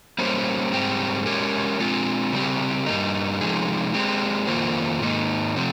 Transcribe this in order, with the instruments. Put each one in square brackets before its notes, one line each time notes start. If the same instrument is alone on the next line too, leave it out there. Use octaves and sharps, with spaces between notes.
[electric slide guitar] G3 A#3 C#4 G4 C5
G#2 G3 C4 G4
G#3 C#4 G4 A#4 C#5
G#3 C4 F4
C#3 G3 C4 G4
G2 G3 A#3 D#4
C3 F3 G#3 D#4 G#4
G#3 C4 G4
F2 D#3 A#3 F4 C5
G#2 D#3 A#3 D#4
C3 F3 C4